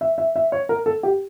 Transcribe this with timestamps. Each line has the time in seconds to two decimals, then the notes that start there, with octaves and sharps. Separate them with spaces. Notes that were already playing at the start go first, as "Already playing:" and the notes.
0.01 E5
0.18 E5
0.36 E5
0.52 C#5
0.69 A#4
0.86 A4
1.03 G4